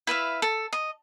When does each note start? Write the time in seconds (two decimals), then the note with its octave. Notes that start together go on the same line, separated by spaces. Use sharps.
0.07 E4 B4 E5 F5
0.42 A4
0.73 D#5